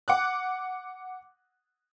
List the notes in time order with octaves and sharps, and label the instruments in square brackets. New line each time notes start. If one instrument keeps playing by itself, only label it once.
[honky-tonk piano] F#5 D6 F#6